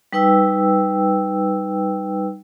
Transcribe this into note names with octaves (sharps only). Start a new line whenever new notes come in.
G3 D#4 B4 G5 E6